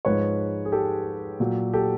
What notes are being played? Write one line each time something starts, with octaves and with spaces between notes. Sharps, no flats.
G#2 F3 G#3 B4 C#5
G#4
G4 A4
A#2 F#3
G4 A4